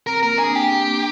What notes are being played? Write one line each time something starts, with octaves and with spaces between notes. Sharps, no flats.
C4 A#4
A#3 A#4
D4 G#4
G4
C4
A#3